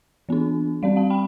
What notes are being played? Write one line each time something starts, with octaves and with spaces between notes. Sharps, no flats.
E3 B3 D4
G3 C4 D5 F5
F5 A5
G5 B5